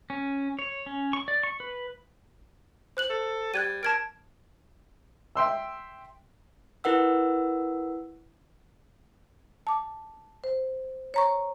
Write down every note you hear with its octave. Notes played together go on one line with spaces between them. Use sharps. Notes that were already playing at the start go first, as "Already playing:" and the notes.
C#4
C#5
C#4
C#6
D5
C#6
B4
C5 F#6 F#7
A4
G3 F#6 G#6 D#7
A#4 A5 G#6 D7
E5 G5 C6 E6
E4 A#4 B4 F#5 E6
A5 D6
C5
C#5 A#5 C#6